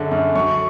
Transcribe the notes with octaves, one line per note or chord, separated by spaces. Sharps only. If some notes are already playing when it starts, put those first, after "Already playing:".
Already playing: F#2 D3 G#3
F#2
F#3 C#6